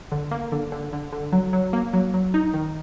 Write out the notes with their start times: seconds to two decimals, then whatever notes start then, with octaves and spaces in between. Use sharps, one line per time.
0.12 D3
0.31 A#3
0.52 D3
0.72 D3
0.93 D3
1.12 D3
1.32 F#3
1.53 F#3
1.73 A#3
1.93 F#3
2.14 F#3
2.34 D#4
2.54 D#3